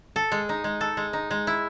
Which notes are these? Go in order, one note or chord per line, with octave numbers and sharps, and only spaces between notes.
A4
G#3
D#4
G#3
A4
G#3
D#4
G#3
E4